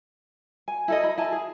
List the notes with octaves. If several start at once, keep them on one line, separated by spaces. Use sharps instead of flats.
G#5
E4 A4 D#5
B5
E4 G#5 A5
G#4